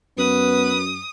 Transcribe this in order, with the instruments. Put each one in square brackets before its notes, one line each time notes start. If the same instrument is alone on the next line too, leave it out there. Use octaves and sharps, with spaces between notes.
[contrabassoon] F#2 [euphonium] B3 [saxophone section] B4 [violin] D#6